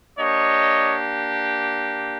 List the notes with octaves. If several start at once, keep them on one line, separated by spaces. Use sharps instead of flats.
A#3 D4 G4 C#5 D#5